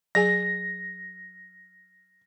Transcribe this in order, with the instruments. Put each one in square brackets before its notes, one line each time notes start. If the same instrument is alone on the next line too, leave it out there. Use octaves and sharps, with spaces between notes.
[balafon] F#3 G#4 G#5 [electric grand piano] A#6